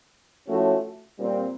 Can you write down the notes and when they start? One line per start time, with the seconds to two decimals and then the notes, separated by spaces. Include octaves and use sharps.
0.48 A2 F3 A3 C#4 F#4
1.19 A#2 G3 C4